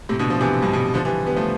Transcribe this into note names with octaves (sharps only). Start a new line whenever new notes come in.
A2 C3
B2 D3
D3 F3
C3 E3
G2 B2
G2 B2
D3 F3
E3 G3
G3 B3
F3 A3